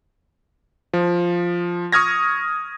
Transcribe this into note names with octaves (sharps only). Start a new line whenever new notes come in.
F3
C#6 D#6 F6 G#6 A#6